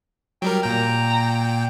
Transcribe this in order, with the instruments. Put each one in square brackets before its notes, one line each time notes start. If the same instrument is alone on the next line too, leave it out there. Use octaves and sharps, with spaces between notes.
[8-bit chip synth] F#3 G3 A#4 [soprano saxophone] G5
[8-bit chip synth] A#2 G5 [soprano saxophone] A#5